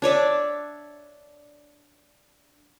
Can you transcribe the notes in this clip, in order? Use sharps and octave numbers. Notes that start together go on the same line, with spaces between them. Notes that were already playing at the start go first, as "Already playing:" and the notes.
D4 C#5 D5 E5